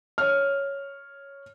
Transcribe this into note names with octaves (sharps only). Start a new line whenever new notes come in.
C#5 F6